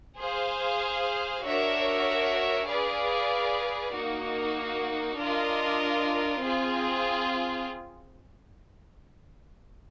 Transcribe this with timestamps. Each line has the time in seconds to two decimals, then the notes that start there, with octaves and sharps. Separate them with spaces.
0.18 G#4 C5 F5
1.43 D4 F#4 A#4 C#5 E5
2.68 G#4 B4 D5 F5
3.94 A#3 D#4 F#4
5.17 D4 F4 A#4 D#5
6.42 C4 F4 G#4